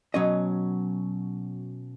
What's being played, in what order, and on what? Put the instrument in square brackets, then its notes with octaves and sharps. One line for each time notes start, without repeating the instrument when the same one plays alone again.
[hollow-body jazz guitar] B2 F#3 C#4 D#5